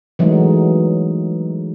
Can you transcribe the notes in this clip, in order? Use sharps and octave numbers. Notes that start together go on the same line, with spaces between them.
E3 F#3 G#3 A3 D#4